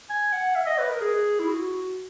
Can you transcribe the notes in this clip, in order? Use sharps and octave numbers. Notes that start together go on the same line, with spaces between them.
G#5
F#5
E5
D#5
B4
A#4
G#4
E4
F#4